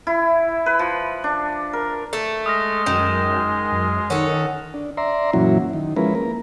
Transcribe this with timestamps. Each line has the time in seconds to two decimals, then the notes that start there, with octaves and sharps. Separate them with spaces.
0.07 E4
0.66 B4
0.79 F3
1.24 D4
1.73 A#4
2.13 A3
2.46 G#3 D#6 F6 A#6
2.86 F#2 D#3
3.72 F#2
4.10 D#3 C#4 A4 F#5
4.74 D4
4.97 D5 E5 A#5 C6
5.33 F#2 A#2 E3 F#3 C#4 E4
5.73 D#3
5.96 F3 G#3 C#4 E4 A#4 B4
6.15 A#3 A#4